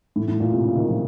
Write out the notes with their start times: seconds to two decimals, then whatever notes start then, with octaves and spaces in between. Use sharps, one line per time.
0.16 A2
0.28 A2
0.40 A#2
0.52 C3
0.64 C#3
0.76 D#3
0.88 F3